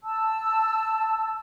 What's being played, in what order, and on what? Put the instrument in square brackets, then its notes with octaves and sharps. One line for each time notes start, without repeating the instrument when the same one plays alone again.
[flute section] A5 E6